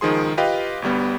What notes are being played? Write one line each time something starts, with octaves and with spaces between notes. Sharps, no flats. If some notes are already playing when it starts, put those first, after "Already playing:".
C#2 D#3 F3 G#4 C6
F4 G4 B4 D#5 F5 G5
G1 D2 G3 B3